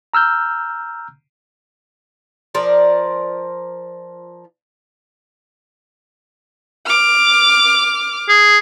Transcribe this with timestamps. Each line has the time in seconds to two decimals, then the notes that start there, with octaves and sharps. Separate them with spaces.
0.14 A#5 E6 F6 G6
2.55 F3 A#4 D5
6.87 D6 F6
8.29 G#4